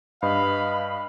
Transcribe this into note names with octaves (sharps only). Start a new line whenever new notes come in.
G2 B4 D#5 F5 B5